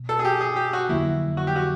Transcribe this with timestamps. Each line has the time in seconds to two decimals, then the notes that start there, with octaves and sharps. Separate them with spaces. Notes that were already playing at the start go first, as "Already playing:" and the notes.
Already playing: B2
0.09 A4
0.19 G#4
0.25 G4
0.41 G#4
0.56 G4
0.73 F#4
0.89 F2 D3 F#3 A#3 E4
1.37 F#4
1.47 G4
1.56 F#4